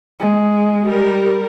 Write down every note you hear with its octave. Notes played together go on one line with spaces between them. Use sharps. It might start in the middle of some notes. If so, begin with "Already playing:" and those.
G#3
G3 A#4